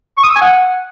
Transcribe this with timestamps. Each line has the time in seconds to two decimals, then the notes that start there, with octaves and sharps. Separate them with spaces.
0.18 C#6
0.23 D#6
0.29 E6
0.35 G#5
0.41 F#5